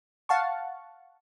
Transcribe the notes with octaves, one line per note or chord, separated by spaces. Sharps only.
F5 F#5 A5 C#6